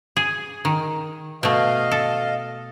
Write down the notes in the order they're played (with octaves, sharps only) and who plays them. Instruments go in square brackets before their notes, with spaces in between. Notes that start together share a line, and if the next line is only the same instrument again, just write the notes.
[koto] G#4
D#3
[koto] B2 A3 [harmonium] D#5 F5
[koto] A4